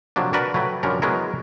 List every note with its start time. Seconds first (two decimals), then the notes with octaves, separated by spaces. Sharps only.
0.16 C3 F3 F#3 A#3 D4
0.33 D4 F#4 A#4 B4 D5
0.54 F#3 A3 B4 G5
0.83 F#2 F3 G3 C#4 D4 A#4
1.02 F#3 G#3 B3 E4 G#4 A#4